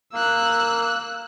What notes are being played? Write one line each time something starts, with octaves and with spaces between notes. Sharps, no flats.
A#3 E6 F#6